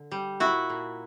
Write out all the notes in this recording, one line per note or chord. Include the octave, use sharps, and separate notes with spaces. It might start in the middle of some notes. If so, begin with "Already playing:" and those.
Already playing: D3
G3
A#2 E4 F#4
A#2